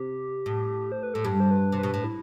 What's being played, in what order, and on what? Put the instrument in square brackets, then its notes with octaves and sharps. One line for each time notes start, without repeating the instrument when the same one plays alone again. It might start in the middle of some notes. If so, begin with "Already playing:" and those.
Already playing: [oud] C3 [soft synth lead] G4
[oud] A2
[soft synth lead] C5
B4
[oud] A2 [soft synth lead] A4
[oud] G2 [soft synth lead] G4
[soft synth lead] C5
B4
[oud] C3
[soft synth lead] B4
[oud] B2
A2
[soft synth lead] E4